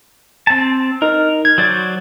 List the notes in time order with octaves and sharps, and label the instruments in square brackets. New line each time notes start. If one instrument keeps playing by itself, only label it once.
[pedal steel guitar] C4 A5
[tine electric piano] D#4 [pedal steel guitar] A#4
[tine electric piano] G#6
[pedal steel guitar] F#3 C5 D5